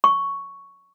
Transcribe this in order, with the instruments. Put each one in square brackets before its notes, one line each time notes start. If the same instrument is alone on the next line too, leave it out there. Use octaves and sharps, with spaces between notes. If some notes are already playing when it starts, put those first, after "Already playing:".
[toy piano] C#6